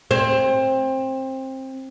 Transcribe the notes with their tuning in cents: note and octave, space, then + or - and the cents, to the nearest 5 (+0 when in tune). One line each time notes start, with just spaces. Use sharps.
C4 +20